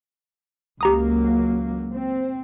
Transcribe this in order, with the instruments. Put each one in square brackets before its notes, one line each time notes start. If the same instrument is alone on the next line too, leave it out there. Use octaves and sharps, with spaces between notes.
[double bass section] C#2 F#3 A#3 [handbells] G4 A#5 D#6
[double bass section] C4